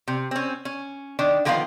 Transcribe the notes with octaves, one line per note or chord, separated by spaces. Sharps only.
C3
C4 C#4
C#4
D#3 D4
D3 D#3 F3 B3 A4 F5